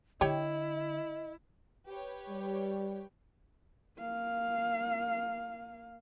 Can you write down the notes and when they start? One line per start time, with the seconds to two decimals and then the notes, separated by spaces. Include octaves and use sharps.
0.21 D3 E4 G4 C#5 D#5 G5
1.87 G4 B4 C#5
2.28 G3
3.99 A#3 F5